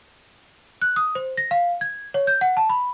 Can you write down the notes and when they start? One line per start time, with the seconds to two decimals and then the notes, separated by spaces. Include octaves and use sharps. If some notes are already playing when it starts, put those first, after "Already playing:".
0.82 F#6
0.96 D#6
1.15 C5
1.37 A#6
1.51 F5
1.81 G#6
2.14 C#5
2.27 G6
2.41 F#5
2.57 A5
2.69 B5